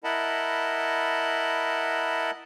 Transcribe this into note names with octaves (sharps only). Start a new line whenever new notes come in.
E4 A#4 D#5 F#5 A5 B5